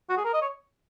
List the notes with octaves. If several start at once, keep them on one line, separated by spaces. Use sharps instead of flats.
F#4
G#4
A#4
D#5
C#5